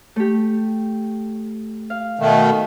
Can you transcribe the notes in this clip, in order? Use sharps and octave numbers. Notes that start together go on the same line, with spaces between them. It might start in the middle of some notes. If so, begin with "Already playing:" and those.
A3 G4
F5
B2 D#3 A3